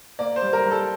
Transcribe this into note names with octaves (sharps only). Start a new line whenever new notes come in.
A#3 D5
C5
G3
A#4
G3
A4